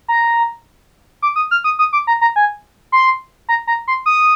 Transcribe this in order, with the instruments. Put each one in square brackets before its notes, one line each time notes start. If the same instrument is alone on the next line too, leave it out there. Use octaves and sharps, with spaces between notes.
[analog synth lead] A#5
D6
D#6
F6
D#6
D#6
D6
A#5
A#5
G#5
C6
A#5
A#5
C6
D#6